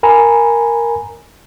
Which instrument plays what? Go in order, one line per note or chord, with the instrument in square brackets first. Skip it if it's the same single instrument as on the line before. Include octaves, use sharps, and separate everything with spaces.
[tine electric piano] A#4 G#5 A#5 B5